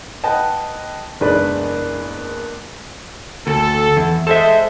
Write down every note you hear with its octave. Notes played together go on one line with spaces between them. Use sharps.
B4 D#5 F#5 G5 A5
F#1 E2 G#3 D4 B4 B5
D2 A4
E2
G#3 A4 C5 E5